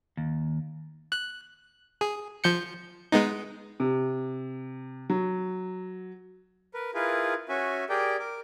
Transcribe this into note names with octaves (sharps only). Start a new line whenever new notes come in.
D#2
F#6
G#4
F3 G6 C#7
G#3 B3 D#4
C3
F#3
A#4 B4
E4 F4 G#4 A#4 B4
C#4 F#4 E5 G#5
G4 G#4 A#4 D5 G5
A#4 D6